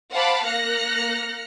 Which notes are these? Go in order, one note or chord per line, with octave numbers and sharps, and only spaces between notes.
C5 F5 F#5 A5 B5 D6
A#3 F6 F#6 A#6 C#7